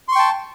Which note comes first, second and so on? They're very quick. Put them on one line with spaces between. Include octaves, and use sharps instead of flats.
C6 C#6 G5 A5